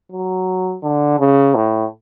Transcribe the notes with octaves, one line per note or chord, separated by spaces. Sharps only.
F#3
D3
C#3
A2